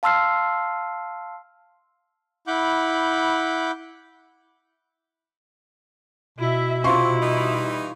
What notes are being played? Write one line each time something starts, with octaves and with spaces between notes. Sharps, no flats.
F5 A5 C6 E6 F6 C7
E4 F#5 B5 D6 G6
B2 E4 E5
C3 E4 F4 C6 C#6
E3 G3 D#4